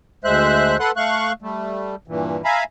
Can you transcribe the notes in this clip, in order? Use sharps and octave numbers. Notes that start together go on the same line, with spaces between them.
D2 G#3 C5 E5 F#6
A4 B4 F#5 C6 F#6
A3 F5 C#6 F#6
G3 A3
G2 A#2 E3
E5 F5 G#5 A#5 B5